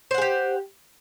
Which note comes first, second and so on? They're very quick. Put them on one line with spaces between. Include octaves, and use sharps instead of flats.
C5 F#5 G#4 G4